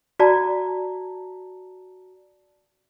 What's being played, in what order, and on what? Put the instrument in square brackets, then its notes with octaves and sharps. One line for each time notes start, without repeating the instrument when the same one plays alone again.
[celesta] F#4 D5 A5 A#5